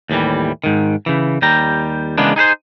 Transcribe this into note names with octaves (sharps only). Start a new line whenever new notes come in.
D#2 A2 E3 G3
G#2 D#3
C#3 E3
D#2 G3 G5 A#5
C#3 E3 G#3 A#3 B3 D4
D#4 G#4 B4 C5